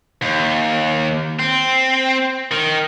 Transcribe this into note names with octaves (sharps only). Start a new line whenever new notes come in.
D#2
C4
D#3